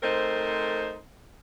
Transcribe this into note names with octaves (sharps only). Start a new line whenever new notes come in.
A3 C4 D#4 A#4 C5